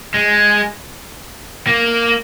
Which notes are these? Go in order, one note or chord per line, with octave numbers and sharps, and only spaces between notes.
G#3
A#3